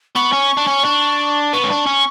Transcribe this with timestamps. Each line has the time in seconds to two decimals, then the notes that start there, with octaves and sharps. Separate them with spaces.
0.15 B3 C#6
0.32 C#4
0.57 D4
0.67 C#4
0.84 D4
1.53 B3 C#6
1.64 C#4
1.70 D4
1.86 C#4